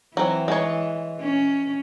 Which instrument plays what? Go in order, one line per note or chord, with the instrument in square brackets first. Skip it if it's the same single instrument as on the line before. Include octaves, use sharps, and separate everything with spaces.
[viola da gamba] E3 [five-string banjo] F#3 C4
[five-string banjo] G#3 C#5
[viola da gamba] C#4